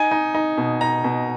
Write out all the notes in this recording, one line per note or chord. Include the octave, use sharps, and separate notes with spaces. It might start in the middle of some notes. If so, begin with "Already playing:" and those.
Already playing: D#4 G#5
D#4
D#4
B2
D#4 A#5
B2